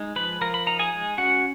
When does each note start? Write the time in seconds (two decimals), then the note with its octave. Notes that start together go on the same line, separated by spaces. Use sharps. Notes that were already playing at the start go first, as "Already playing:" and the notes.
Already playing: G#3 D#4
0.16 F3 B4 B5
0.41 F3 A#4 A#5
0.54 B5
0.66 D#4 A#5
0.79 G#4 G#5
0.92 G#3
1.18 C#4 F#4 F#5